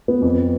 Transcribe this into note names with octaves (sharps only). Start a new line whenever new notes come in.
B3
F2